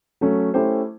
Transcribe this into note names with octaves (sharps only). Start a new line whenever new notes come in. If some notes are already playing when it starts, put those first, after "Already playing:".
F#3 A3 C#4
A3 C#4 E4 G4 C5